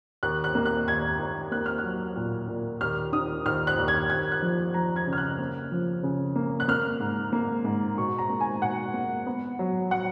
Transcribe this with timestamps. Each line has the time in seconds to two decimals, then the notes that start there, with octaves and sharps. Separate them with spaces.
0.23 D#2 F#6
0.44 F#6
0.55 A#3
0.66 F#6
0.87 D#2 G#6
1.19 D#2
1.51 A#3 F#6
1.66 F6
1.78 F#6
1.84 F#3
2.16 A#2
2.48 A#2
2.81 D#2 F6
3.13 D#3 D#6
3.46 D#2 F6
3.67 F#6
3.78 D#2
3.88 G#6
4.10 D#2 G#6
4.32 F#6
4.42 F3
4.74 F3 A#5
4.96 G#6
5.07 C#3
5.13 F6
5.18 F#6
5.39 A#3
5.72 F3
6.03 C#3
6.36 A#3
6.60 F#6
6.68 A#3 F6
7.00 G#2
7.33 A#3
7.64 G#2
7.98 B2 C#6
8.19 A#5
8.29 A#3
8.41 G#5
8.62 B2 F#5
8.94 A#3
9.26 B3
9.59 F#3
9.91 F#3 F#5